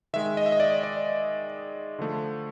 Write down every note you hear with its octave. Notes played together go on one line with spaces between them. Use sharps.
D#3 G#3 E5
D#5
E5
D#5
D5
D5
D3 F3 A3